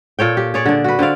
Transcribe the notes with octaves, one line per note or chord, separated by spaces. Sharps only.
A#2 A4 C#5 G5
G4
G#4 C#5 D5
D3 D4
F#4 B4
D3 C4 D5 F5